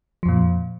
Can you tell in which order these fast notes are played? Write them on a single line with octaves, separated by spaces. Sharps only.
F3 F2 A#2